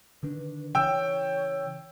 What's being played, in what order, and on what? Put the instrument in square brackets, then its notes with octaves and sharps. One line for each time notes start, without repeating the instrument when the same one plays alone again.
[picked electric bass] D3 D#3 D4 [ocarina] B4
[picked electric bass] C#3 E3 [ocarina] C#5 [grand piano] G5 E6